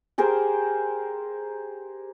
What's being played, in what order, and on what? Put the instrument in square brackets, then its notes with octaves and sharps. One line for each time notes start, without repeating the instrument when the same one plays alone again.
[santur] G4 G#4 A#4 C5